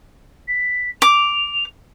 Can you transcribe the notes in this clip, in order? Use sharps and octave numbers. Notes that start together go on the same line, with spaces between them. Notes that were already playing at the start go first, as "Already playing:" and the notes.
B6
D6 F7